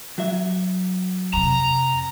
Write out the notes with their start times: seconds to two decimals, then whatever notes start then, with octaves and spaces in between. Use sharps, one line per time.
0.18 F#3 F#4 E5
1.33 F2 C3 A#5